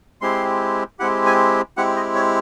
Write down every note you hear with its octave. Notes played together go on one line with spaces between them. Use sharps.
G#3 C4 E4 G4 C6
G#3 C4 E4 G4 F#5
G#5
G#3 C4 E4 G4 F#5
D#5
C#5